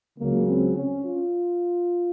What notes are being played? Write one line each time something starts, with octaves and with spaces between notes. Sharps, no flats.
C#2 C#3 F#3 A#3
C4
C#4
F4